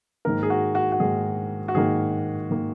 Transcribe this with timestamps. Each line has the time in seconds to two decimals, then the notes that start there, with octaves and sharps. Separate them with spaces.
0.25 G#2 D#3 A#3 A#4
0.43 G#4
0.50 F#4
0.75 F#4
0.92 F#4
1.00 G#2 D#3 A#3 G#4
1.68 F#4
1.74 G#2 D#3 A#3 G#4
2.51 D#3 A#3